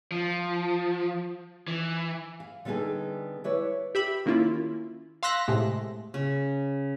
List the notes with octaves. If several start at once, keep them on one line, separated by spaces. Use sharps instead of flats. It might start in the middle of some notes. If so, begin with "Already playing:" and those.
F3
E3
F5
D3 G3 B3 D#4 G#4 A4
E4 B4 C#5 D5
G4 E5 B5
D#3 A#3 C#4 E4 F4
F5 C6 E6 F#6 A#6 B6
A2 C3 G#3 A3
C#3